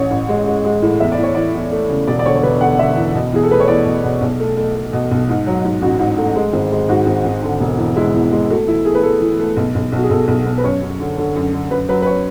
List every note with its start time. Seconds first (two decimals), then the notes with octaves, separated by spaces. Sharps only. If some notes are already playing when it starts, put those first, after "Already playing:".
Already playing: A1 C#5
0.11 A1
0.29 G#3
0.47 G#3
0.65 G#3
0.82 A2
1.00 E2 E5
1.12 D5
1.18 E2
1.23 C#5
1.35 E3 D5
1.54 E2
1.71 A3
1.89 C#3
2.08 E1 D5
2.19 D5
2.25 D3 C#5
2.36 C#5
2.43 E1 B4
2.61 D3 F#5
2.78 D3 E5
2.97 E2
3.15 B2
3.32 E2 G#4
3.43 A4
3.50 A3 B4
3.60 C#5
3.68 E2 D5
3.85 B2
4.04 B2
4.21 B1
4.40 A3
4.57 A3
4.75 A3
4.93 B2
5.11 B1
5.29 G#2
5.47 F#3
5.65 G#2
5.82 A1 F#4
5.99 G#2
6.17 A3
6.35 G#3
6.53 G#1
6.72 G#3
6.89 G#2 F#4
7.07 G#1
7.25 G#1
7.43 D3
7.60 E1
7.78 E2
7.96 G#3 E4
8.14 E2
8.32 G#3
8.50 A3 F#4
8.67 E3 E4
8.85 A3 G#4
8.95 B4
9.03 A3 A4
9.21 E3
9.39 A3
9.57 B1
9.75 B1
9.92 B1 F#4
10.03 G#4
10.10 B1 A4
10.28 B1
10.46 B1
10.58 B4
10.63 F#2 C#5
10.82 F#2
11.00 D3
11.18 D3
11.36 F#2
11.53 D3
11.71 F#2 B4
11.89 F#3 B4
12.02 B4
12.06 C#5